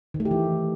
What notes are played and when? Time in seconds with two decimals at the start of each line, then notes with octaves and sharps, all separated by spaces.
0.14 D#3
0.20 A3
0.25 G4
0.31 E3